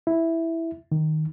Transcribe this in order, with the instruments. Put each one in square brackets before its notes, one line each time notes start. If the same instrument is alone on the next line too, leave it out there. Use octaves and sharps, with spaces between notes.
[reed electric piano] E4
D#3